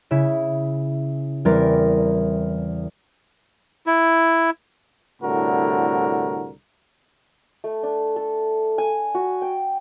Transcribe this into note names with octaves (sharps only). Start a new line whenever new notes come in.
C#3 E4 E7
E2 E3 G3 C4 A#4 A6
E4
C2 A2 D3 F#4 A#4
A3
D4
A4
G#5
F#4
G5